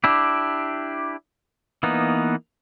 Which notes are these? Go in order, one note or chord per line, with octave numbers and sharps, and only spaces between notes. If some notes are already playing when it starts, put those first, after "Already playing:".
D4 E4 G4
E3 A#3 B3 D#4